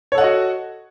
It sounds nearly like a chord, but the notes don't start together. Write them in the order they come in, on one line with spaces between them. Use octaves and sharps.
C#5 A4 F#5 D#5 F#4